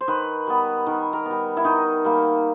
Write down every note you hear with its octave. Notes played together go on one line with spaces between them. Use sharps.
C5
D#3 B4
G3 B3
D#3 A#4
A#4
G3 B3
E4
D#3 D#4
G3 A#3